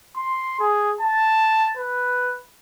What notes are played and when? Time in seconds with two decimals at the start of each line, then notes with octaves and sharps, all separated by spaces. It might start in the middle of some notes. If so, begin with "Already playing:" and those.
0.16 C6
0.60 G#4
1.01 A5
1.77 B4